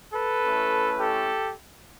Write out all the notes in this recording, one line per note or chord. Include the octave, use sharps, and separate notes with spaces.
A4 B4
A3 C#4 E4
G4 A4